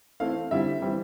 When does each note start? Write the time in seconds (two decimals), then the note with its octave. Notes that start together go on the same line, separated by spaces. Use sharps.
0.20 E3 A3 C4 E4 F5
0.51 D3 G3 C4 E4 E5
0.82 E3 G3 C4